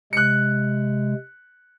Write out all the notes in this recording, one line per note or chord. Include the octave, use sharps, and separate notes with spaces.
C3 G#3 F#6 C#7